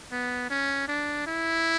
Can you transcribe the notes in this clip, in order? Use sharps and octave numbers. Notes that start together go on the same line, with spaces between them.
B3
C#4
D4
E4